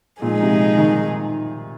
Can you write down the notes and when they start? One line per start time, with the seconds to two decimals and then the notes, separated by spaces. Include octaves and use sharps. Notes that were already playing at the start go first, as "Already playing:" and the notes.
0.22 A#2 F3 G#3 D#4 G#4
0.43 C3
0.78 D#3